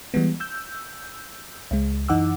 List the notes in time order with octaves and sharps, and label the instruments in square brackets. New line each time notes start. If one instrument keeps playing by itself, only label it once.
[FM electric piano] E3 G3 G#3 B3
E6 G6
C#2 G#3
F#2 E3 D#4 F#5 D6 E6